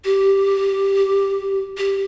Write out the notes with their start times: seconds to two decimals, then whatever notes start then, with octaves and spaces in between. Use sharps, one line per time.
0.05 G4
1.77 G4